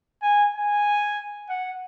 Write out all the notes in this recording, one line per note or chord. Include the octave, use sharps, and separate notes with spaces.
G#5
G#5
F#5